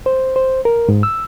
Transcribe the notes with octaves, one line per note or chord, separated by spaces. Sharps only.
C5
C5
A#4
G#2
E6